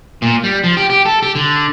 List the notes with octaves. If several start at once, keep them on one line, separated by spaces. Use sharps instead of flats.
A#2
G3
F3
G4
G4
A4
G4
D3